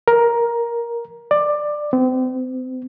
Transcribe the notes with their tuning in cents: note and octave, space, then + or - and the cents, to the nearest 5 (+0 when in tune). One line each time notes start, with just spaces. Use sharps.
A#4 +10
D5 +15
C4 -35